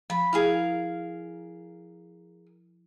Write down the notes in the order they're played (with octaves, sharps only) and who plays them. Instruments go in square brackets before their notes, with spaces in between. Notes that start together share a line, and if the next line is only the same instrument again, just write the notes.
[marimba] F3 [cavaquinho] B5
[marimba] E4 [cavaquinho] G#4 A#4 F5